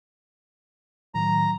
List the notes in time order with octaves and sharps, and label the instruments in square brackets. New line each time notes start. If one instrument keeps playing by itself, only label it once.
[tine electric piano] A2 D#3 F#3 [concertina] A#5